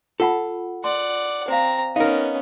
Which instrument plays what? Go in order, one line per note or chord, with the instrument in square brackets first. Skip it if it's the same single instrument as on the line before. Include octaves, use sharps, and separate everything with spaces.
[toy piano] F4 F#5 B5 [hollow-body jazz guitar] A4
[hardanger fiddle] D5 F#5 [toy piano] C6
[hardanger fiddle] C4 A#5 [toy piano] C5 F5
[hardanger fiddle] B3 C#4 [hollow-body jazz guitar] D#4 A#4 [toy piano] F5